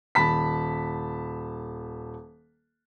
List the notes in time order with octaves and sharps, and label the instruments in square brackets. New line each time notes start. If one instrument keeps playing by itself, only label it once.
[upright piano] D#1 A5 B5 B6